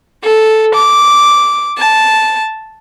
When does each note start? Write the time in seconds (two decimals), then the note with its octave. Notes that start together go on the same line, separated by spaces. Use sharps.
0.24 A4
0.75 D6
1.78 A5